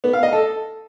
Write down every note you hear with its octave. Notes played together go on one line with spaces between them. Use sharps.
B3
F5
D#5
A4